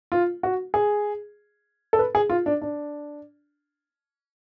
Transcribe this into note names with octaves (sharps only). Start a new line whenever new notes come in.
F4
F#4
G#4
A4
B4
G#4
F4
D4
D4